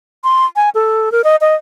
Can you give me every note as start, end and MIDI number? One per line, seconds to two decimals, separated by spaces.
0.24 0.46 84
0.56 0.70 80
0.75 1.12 69
1.12 1.22 70
1.24 1.36 75
1.41 1.55 75